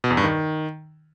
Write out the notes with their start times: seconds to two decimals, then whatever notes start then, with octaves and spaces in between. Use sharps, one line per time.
0.04 B2
0.11 E2
0.17 G2
0.24 D#3